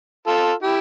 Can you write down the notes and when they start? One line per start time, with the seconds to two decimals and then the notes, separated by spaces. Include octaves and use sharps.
0.27 F4 A4
0.62 E4 G4